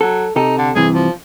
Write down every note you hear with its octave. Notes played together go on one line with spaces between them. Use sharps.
F#3 A4
C3 D#4 G4 A4
D3
G2 C3 E3 G#4
F3